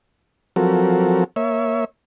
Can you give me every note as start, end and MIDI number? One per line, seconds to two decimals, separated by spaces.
0.56 1.24 53
0.56 1.24 54
0.56 1.24 60
0.56 1.24 66
0.56 1.24 69
0.56 1.24 70
1.36 1.85 58
1.36 1.85 73
1.36 1.85 76